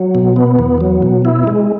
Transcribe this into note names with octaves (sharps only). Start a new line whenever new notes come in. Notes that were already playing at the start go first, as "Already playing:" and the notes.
Already playing: F#3
B2
B3
E2
F#3
B2
E4
G#3